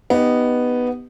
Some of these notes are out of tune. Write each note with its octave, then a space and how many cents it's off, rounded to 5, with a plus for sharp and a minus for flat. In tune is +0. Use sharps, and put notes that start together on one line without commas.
B3 +0 D#4 -10 G4 +0